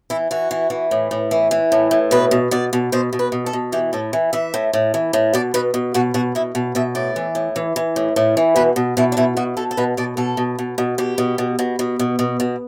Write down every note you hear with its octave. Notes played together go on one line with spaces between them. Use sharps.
E3 E4
E3 F#4
E3
E3
A2
A2
E3
E3
A2
A2
B2 B4
B2
B2 D5
B2
B2 C5
B2
B4
B2
A4
B2
E3 G4
A2 A4
E3
E3 E5
A2
A2
E3
A2
B2 D5
B2 B4
B2
B2 F#4
B2 F#4
B2 E4
B2
B2 E5
A2 D5
E3
A2
E3
E3
A2
A2
E3
B2 B4
B2
B2 E4
D4
B2 E4
B2 F#4
B2 A4
A4
B2 B4
B2 D5
B2 A4
B2
B2
B2
B2 G4
B2
B2
B2
B2
B2
B2
B2